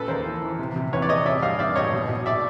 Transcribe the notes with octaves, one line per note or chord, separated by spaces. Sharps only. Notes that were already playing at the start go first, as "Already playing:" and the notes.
Already playing: A#2 C#3 A4 B4
D#2 A#4 C5
E3
E3
C3
C3
E2 B4 C#5
D5
C3 C#5 D#5
A1 D5 E5
G2 D#5 F5
G2 D5 E5
A1 C#5 D#5
B2
B2
D5 E5